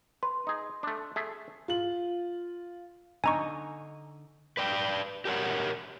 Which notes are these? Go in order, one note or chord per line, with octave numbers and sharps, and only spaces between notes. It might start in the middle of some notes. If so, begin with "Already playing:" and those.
B4 C6
D#4 G#4
A3 D4
A3 G#4 E5
F4 F#7
D3 D#4 G#5 A#5 C#6
B4 D5 G5
G4 A#4 C#5 F#5